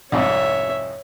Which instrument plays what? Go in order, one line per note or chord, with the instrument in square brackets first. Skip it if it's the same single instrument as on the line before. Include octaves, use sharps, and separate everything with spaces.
[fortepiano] C2 F2 G#2 [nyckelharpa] C#5 E5